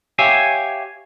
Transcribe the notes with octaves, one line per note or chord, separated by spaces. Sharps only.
G4 C#5 E5 F5 G#5